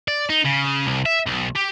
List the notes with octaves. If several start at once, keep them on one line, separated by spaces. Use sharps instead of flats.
D5
D#4
C#3
C2
E5
B1
G4